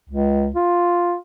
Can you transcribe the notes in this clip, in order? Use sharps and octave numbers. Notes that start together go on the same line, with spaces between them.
C#2
F4